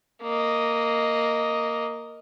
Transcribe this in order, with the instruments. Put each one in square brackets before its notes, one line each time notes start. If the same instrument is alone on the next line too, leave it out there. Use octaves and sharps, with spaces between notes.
[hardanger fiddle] A#3 D#5